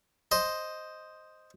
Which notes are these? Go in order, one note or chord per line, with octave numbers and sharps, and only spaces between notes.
C5 D#5